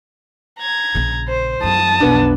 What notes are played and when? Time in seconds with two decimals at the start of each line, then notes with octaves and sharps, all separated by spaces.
0.59 A#5 G#6
0.95 A#1 C#3
1.28 C5
1.63 F#2 A5 D#6
2.00 B1 F2 B3 D4